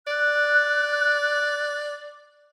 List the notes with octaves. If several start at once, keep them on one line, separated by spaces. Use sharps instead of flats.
D5 F#6